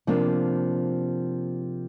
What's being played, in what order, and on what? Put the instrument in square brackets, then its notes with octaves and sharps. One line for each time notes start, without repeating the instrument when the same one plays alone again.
[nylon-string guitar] C3 F3 A#3 D4